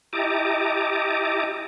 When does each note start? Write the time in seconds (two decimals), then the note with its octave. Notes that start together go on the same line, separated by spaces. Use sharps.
0.13 E4 G4 D#5 A5 A#5 D6